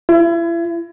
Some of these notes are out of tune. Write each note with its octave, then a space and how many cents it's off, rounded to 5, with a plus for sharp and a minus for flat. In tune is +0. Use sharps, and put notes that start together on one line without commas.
E4 +35